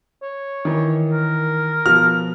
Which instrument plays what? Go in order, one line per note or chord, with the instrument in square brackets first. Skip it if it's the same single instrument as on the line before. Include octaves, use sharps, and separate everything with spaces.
[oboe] C#5
[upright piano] D#3 E3
[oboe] A#4
[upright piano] B2 F3 [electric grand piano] F6